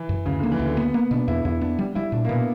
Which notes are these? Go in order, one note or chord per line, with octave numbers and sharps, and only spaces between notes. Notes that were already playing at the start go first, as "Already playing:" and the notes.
Already playing: E3
F#2
D2 C#3
D3
A#3
E3
D2
D3
A#3 B3
A#3 B3
B2 D4
E2 E4
E2 E4
B3 D4
G3
G3 E4
A#2 D4
A#3
B2 B3